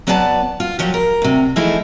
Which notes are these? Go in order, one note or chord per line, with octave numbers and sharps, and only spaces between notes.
F#3 B3 B4 D5 G#5 A5
F4
F3 F#3 G4
A#4
D2 C3
E3 F3 G#3 A3 D#4 E4